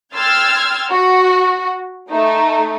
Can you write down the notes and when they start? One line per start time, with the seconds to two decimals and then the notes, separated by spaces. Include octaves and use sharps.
0.16 G5 C6 E6 F6 G#6 A6
0.90 F#4
2.12 A3 D#4